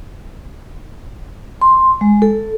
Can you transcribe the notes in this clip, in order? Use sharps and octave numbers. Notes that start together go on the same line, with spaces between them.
C6
G#3
A4